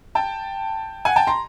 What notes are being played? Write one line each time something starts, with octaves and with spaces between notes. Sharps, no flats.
G5 A5
F#5 G#5
G5 A5
A#5 C6